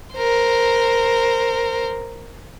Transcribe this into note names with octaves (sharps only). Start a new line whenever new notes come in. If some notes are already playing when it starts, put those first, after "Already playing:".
A#4 C5